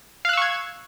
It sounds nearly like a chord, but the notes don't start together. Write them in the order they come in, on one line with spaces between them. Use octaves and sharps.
F5 F#6 E6 C#6 G#6